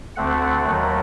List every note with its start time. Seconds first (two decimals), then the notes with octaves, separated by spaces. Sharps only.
0.16 D2 D3 A3 C4 F#5
0.65 D#2 D#3 F#3 A3